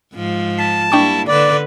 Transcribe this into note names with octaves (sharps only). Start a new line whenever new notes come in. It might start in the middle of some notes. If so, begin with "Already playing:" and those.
G#2 F3
A5 B6
G3 A#3 D4 E4 G5 C#6
D3 B4 D5